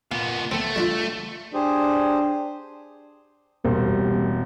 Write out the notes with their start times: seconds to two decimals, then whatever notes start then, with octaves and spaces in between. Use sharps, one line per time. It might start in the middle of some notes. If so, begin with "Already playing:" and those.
0.11 A#2 B3 F5
0.51 A3 B3 C4
0.76 G3 D4 F4
1.54 D4 G4 G#4 C5
3.65 E1 G3 A#3 C4